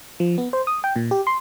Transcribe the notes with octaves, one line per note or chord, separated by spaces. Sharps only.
F3
B3
C5
D#6
G5
A#2
G4
C6